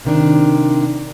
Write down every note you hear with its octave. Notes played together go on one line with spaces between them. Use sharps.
C3 D#3 D4